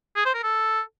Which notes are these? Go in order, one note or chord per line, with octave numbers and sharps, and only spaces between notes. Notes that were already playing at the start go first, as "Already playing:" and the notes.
G#4
C5
A#4
A4